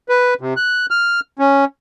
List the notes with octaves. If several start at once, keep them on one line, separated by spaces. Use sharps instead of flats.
B4
C3
F#6
F6
C#4